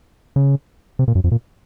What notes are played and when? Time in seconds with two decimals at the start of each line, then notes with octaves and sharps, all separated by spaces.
0.36 C#3
0.99 C3
1.08 A#2
1.15 F#2
1.24 F2
1.32 A#2